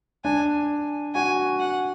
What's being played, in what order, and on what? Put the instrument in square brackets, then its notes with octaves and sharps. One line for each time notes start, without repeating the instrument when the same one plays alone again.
[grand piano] D4 [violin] G#5
[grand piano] F#4 [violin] G#5
[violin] F#5